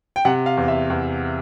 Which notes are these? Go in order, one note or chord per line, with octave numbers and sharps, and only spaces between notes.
G5
C3 F#5
F5
E2
E5
E2